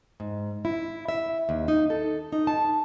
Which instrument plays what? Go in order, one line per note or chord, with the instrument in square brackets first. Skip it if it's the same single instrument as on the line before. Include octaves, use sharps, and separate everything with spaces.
[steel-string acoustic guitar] G#2
E4
E5
D#2
D#4
A4
D#4
A5